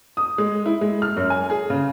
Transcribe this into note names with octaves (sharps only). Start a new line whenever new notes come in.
D#6
G#3
E4
G#3
F6
F#2
G#5
G#4
C#3